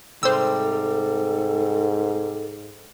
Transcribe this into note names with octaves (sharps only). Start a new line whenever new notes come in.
G#2 C3 G3 A4 C5 E6